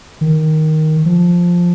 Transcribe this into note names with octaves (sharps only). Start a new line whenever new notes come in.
D#3
F3